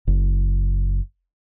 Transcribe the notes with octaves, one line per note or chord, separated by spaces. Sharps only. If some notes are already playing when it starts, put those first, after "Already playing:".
F#1